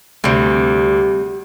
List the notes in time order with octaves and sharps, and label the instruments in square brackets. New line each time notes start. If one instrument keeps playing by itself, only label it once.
[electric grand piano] D2 [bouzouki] C3 G3